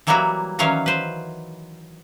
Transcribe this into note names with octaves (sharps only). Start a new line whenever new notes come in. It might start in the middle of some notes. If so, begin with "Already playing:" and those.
E3 F#3 G3 A#3 E4 F#4
D#3 E3 F#3 C#4 C#5 F5
B4 C5